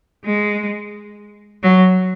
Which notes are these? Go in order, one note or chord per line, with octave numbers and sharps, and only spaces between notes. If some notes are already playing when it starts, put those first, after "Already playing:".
G#3
F#3